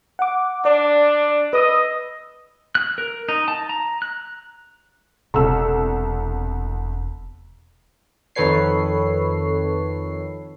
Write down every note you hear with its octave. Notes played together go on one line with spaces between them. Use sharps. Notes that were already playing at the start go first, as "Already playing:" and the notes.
F#5 D6
D4 D5
B4 D#5 D#6 E6
F#6
A#4
D#4
A5
A#5
F#6
E1 C2 A4 E6
F2 D#3 A4 B4 C#5 C7